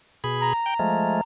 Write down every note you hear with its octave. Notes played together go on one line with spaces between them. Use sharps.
B2 G#4 B5
A#5
G5
F3 G#3 A3